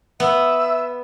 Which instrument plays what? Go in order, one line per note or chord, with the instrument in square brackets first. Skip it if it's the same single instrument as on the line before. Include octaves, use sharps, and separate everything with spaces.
[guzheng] B3 [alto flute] E5